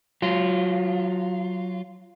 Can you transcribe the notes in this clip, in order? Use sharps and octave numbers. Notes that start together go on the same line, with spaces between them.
F#3 F4